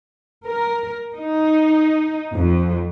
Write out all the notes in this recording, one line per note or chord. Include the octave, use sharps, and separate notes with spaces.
A#4
D#4
F2